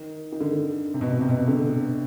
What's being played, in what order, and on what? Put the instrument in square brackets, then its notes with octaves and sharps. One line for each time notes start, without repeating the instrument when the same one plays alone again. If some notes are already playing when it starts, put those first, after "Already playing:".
Already playing: [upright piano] D#3
D#3
D3
C3
B2
C3
C3
B2
C3
D3